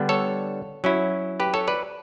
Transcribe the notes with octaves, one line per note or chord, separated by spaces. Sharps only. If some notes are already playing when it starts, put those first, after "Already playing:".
Already playing: D3 G3 B3 D4
A4 C#5
F#3 C#4 E4
G4 B4
A4 C#5
B4 D5